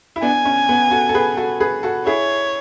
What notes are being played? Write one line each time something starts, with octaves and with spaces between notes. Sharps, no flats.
E4
B3 D4 G#5
C#4
B3
F#4 A4
A4
G#4 B4
F#4 A4
G#4 B4
F#4 A4
E4 G#4 C#5